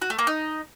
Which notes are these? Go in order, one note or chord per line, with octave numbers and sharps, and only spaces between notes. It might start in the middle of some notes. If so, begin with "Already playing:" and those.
F#4
A3
A#3
D#4